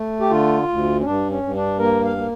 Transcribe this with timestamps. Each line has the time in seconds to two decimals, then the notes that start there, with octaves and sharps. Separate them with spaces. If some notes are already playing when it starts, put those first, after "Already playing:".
Already playing: A3
0.20 G4
0.30 D3 F4
0.68 D2
1.00 C#4
1.04 G2 D4
1.29 C#4
1.43 G2
1.55 D4
1.79 A#3 A#4
2.05 F5
2.17 A#3